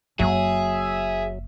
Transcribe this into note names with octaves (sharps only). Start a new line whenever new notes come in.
F#1 F#3 G#4 E5